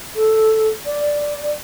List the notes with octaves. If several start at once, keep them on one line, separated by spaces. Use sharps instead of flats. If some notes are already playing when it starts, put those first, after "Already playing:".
A4
D5